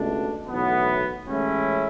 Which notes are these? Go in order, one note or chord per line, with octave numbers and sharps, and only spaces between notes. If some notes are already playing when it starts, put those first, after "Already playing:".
Already playing: C#2 B2 A3 D4
B1 A2 E3 B3
A1 A2 G#3 C#4 E4